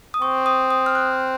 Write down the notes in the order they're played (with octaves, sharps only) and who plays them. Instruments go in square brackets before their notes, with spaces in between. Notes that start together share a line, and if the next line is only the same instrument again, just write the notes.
[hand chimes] D#6
[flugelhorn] C4 [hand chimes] C#6
[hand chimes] D#6
D#6
F6
F#6